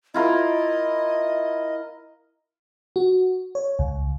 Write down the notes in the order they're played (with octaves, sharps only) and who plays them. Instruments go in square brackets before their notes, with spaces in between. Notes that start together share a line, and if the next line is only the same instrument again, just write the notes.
[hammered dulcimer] E4 F4 A#4 [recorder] D#5
[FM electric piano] F#4
C#5
C#2